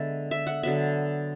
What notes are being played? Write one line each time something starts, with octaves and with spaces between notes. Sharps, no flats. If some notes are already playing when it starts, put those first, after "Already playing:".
Already playing: D3 G#3 B3 E5
E5
F#5
D3 F#3 B3 E5